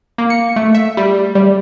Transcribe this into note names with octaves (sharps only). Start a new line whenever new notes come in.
A#3
C#7
A3
E5
G3
G3